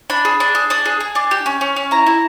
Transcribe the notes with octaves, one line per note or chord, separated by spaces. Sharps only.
D4 B5
G#4
D4
G#4
D4 D#6
G#4
G#4
D4
G4
C#4
C#4
C#4
E4 A#5
E4